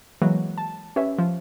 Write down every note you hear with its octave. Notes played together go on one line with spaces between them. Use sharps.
E3 F#3 G#3 A#3
A5
C#4 G4 B4 E5
F3